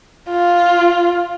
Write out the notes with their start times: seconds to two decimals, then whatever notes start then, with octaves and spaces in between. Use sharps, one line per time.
0.29 F4